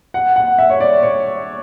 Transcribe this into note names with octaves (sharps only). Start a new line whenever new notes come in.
F#5
F#5
E5
C#5
D5
C#5